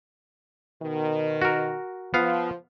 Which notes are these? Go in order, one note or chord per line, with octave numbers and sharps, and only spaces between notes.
B2 D#3
F#4 A#4
F3 B3 F5